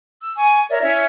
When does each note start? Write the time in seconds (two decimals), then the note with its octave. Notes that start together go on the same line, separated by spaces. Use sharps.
0.22 E6
0.36 G#5 C#6
0.70 A#4 C#5 D5 E5
0.82 C#4 E4 C#5 E5